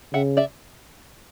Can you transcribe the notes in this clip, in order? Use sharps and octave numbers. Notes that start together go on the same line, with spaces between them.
C#3 E5 F#5
D5 E5